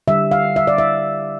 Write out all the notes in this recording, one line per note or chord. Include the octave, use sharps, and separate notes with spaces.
D3 G3 E5
F5
E5
D5
E5